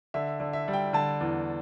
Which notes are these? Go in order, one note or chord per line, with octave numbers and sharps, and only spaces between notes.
D3 E5
D3
E5
G3
G5
D3 A5
E2